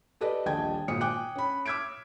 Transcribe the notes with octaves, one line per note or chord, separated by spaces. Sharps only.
G4 A4 B4 D5 D#5
D#1 A#1 D#5 G5 A5 G#6
G#1 A#2 D#6 C#7
G5 G#5 D6 F#6
C#4 B5
D6 E6 F6 G#6 B6 D7